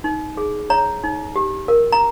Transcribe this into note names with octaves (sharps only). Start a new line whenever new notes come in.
D#4
G#4
C#5 A#5
D#4
G4
A#4
A#5